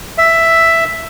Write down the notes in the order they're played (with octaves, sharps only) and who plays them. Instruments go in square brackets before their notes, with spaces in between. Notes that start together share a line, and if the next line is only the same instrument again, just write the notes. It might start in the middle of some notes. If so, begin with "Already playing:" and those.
[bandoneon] E5